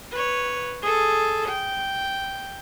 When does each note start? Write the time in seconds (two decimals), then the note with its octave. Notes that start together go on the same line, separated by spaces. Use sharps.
0.12 B4 C#5
0.82 G#4 A4
1.49 G5